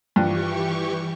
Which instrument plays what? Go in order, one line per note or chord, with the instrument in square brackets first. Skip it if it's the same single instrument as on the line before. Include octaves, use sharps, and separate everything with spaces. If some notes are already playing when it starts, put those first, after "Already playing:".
[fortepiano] G2 F3 [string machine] E3 G4 C#6